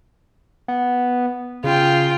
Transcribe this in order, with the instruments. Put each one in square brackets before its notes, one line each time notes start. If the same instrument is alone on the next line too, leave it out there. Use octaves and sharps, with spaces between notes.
[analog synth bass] B3
[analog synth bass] C#3 [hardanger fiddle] F4 G5